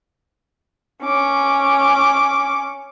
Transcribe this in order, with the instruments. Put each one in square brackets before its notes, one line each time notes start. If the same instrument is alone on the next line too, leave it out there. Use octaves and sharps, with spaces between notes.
[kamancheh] C#4 D6